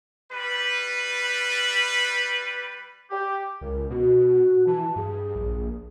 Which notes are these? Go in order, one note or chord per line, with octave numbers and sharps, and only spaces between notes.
G3 B4
G4
C#2 A#4
B2 F#4
E3 A5
G2 G#4
A#1